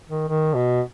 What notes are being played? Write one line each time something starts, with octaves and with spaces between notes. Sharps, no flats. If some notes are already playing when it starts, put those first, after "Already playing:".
D#3
D#3
B2